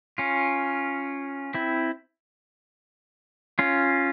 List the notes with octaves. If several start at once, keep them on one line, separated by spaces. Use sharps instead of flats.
C#4 F4
C4 E4
C#4 F4